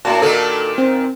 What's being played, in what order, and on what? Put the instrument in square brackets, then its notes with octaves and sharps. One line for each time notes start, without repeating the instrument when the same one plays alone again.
[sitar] A2 [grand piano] A#3 D4 F#4 [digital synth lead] A5
[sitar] A#2 D#3 D#4 [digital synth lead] A4
[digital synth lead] C4